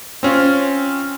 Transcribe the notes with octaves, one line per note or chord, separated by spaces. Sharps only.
C4 C#4 F4